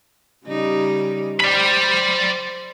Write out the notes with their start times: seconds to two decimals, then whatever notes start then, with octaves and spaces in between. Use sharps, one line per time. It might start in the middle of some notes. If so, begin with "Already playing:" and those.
0.47 C#3 G3 D#4
1.40 C5 D5 B5